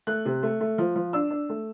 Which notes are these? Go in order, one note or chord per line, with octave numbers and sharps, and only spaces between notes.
A3 F#6
C3
A3
A3
F3
F3
D4 E6
D4
A3